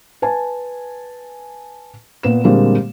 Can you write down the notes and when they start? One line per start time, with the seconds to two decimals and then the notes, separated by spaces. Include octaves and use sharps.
0.22 B4 G#5 A5
2.23 A#2 B3 E7
2.44 A#2 D3 G3 G#3 A#3 C4